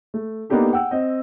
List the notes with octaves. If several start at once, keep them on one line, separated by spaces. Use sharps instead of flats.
A3
A#3 B3 D4 D#4 G4 A4
F#5 G5 E6
C4 D#5